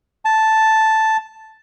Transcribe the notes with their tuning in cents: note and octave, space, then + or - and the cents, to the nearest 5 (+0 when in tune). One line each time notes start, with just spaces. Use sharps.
A5 +0